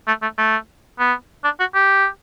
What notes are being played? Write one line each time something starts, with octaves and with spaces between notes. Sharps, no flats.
A3
A3
A3
B3
D4
F#4
G4